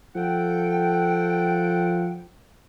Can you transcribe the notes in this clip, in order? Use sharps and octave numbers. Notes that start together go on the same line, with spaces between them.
F3 A4 F#5 G5